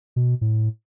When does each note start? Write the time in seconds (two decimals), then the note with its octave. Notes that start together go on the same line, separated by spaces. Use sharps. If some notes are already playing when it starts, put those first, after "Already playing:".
0.16 B2
0.41 A2